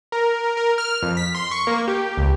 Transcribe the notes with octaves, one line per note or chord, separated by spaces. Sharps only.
A#4
A#4
A#4
F6
F2
B6
C6
C#6
A#3
G4
C#2